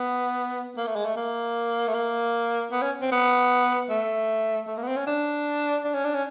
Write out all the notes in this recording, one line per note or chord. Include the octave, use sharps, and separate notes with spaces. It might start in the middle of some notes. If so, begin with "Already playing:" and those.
Already playing: B3
A#3
A3
G#3
A3
A#3
A3
A#3
B3
C#4
C4
B3
A3
A3
A#3
B3
C4
C#4
D4
D4
C#4
D4
C#4